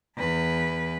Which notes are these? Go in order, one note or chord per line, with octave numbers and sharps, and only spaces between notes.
E2 B4